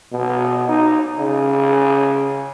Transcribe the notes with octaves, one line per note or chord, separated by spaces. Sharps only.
B2
D#4
C#3